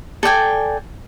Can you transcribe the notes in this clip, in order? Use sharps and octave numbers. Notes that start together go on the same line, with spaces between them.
A4 D5 G5 G#5